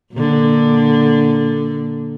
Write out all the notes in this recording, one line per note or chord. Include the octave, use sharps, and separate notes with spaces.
A#2 D3